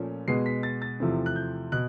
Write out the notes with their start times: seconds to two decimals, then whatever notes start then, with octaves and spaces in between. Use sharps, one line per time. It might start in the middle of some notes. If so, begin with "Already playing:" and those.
Already playing: A#2 F3 A3 C#4
0.28 B2 G#3 B3 C7
0.46 B6
0.63 A6
0.82 A6
1.00 E2 C3 F3 A3 C4
1.26 F#6
1.36 G6
1.72 B2 F#6